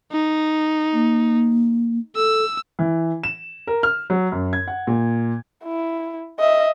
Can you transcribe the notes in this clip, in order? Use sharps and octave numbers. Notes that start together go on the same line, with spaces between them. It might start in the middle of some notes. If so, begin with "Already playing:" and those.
D#4
A#3
A4 E6
E3
E7
A#4
F6
F#3
F#2
G#6
F#5
A#2
E4
D#5 E5